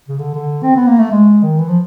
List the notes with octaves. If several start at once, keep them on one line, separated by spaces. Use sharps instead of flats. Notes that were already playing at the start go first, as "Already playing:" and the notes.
C#3
D3
D3
C4
B3
A#3
A3
G#3
D#3
E3
F3